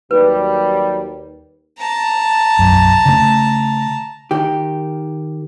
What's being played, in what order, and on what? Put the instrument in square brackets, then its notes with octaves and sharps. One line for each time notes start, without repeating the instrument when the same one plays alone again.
[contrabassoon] D#2 [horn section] F#3 G3 [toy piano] B4
[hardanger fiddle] A5 A#5
[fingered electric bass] B1 F#2
C#3 A3
[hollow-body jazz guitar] D#3 G4